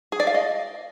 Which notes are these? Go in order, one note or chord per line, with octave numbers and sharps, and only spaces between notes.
G#4
D5
F5
D#5